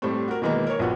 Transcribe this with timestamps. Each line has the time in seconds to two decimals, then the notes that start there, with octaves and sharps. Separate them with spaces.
0.02 A2 G3 A3 C4
0.28 F#4 A#4
0.42 B2 D#3 E3 G#3 A#3
0.67 A#4 C#5
0.79 A#1 F3 B3 F#4